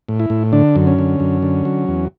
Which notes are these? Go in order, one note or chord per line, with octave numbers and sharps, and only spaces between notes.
A2
E4
A2
D3 D4
F#2
C#4
D3
F#2
D3
F#3
E2